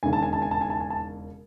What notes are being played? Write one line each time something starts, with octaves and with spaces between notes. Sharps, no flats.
E1 D#2 C#3 G#5
A5
G#5
A5
G#5
A5
G#5
A5
G#5
A5